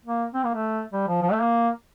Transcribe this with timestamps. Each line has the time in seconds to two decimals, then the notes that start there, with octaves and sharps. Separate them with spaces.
0.05 A#3
0.34 C4
0.44 A#3
0.54 A3
0.93 G3
1.08 F3
1.22 F3
1.32 A3
1.42 A#3